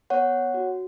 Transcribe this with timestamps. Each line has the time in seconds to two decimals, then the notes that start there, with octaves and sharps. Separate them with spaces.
0.10 B3 C#5 F#5
0.54 F#4